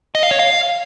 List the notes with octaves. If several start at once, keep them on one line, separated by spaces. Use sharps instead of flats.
D#5
F5
C#5
F5